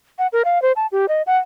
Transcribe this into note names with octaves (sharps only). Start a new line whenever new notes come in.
F#5
A#4
F5
C5
A5
G4
D#5
F#5